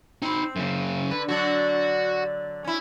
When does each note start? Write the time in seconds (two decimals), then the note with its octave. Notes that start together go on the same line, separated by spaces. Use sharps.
0.22 C4 D#4 B5
0.56 F#2 C#3
1.11 D3 B4
1.29 D3 F#3 D4 F#4
2.64 C#4 E4